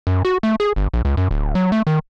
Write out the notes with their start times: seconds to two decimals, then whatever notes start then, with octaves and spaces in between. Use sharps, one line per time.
0.07 F#2
0.25 F#4
0.43 A3
0.60 G#4
0.76 G1
0.94 A#1
1.05 C#2
1.17 F#2
1.31 D1
1.55 F#3
1.72 A3
1.87 D#3